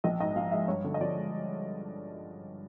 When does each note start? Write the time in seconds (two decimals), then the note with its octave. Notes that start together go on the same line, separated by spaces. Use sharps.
0.04 A#1 D#5
0.20 G#2 D#5
0.36 F3 F5
0.51 G#3 E5
0.68 G2 C#5
0.84 D3
0.94 D#5
1.01 F3 D5
1.16 G#3